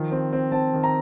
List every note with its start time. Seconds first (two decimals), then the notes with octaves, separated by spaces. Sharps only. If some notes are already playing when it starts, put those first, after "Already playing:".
Already playing: D#3 F3
0.12 C4
0.33 C4
0.52 C4 A5
0.73 D#3
0.84 A#5